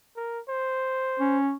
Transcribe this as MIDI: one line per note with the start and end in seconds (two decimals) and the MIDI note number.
0.16 0.40 70
0.49 1.38 72
1.20 1.54 61